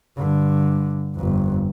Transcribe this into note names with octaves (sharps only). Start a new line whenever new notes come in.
G2 D3
G1 F2